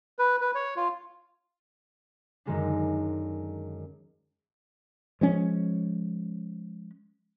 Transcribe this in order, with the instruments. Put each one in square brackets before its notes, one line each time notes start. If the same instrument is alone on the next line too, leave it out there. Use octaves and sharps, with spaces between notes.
[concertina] B4
B4
C#5
F4
[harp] F#2 D3 D#3 G#3 C#4 D4
[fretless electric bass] F3 G#3 C#4